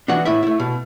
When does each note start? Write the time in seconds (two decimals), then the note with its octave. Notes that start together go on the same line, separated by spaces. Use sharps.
0.08 E3 B3 D4 F#4 F#5
0.25 A2 E4 E5
0.43 A3 E4
0.60 B2